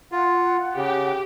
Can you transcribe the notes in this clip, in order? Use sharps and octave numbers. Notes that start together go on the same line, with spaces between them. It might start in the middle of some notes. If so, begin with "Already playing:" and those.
F4 F#5
C#3 G4